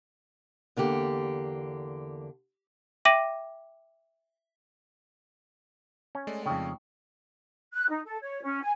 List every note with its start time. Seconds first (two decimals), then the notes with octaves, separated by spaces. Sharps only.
0.77 E2 D3 A#3 G4
3.05 E5 G5 D6 A#6 D#7 F#7
6.15 C#4
6.27 G#3 A3 D5
6.46 F2 C#3 D#4 G5 C#6
7.73 F#6
7.89 D#4
8.05 A4
8.22 C#5
8.42 C#4
8.63 G#5